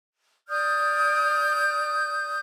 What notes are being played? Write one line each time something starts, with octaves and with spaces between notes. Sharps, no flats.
D5 D#6 F6 G6